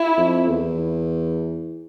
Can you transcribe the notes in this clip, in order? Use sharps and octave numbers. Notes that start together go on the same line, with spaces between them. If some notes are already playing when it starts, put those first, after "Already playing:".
Already playing: E4
F2
E2